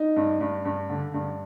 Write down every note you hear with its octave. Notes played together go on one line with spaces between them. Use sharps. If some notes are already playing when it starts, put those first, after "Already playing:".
Already playing: D#4
G2
G2
G2
D3
G2